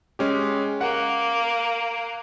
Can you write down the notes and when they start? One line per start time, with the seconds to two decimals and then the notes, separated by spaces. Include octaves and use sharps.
0.19 G#3 C#4 G4
0.81 A#3 F#5